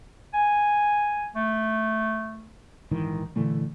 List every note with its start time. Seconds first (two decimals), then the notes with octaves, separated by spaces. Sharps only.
0.34 G#5
1.36 A3
2.91 A#1 G#2 D#3 E3
3.36 A#2 D3 E3 A3